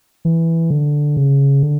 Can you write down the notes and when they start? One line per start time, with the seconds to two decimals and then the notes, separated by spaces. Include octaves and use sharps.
0.25 E3
0.71 D3
1.17 C#3
1.63 D3